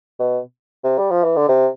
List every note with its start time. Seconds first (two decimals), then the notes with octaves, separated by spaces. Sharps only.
0.20 B2
0.84 C3
0.98 G3
1.11 F3
1.24 E3
1.36 D3
1.49 C3